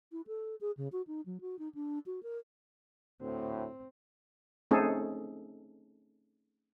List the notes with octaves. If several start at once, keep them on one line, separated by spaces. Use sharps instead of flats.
E4
A4
G#4
C#3
F#4
D#4
F#3
F#4
D#4
D4
F#4
A#4
D2 A2 C4
A3 C4 C#4 D#4 G#4 A4